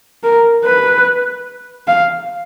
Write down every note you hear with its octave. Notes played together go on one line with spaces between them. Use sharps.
A#4
B4
F5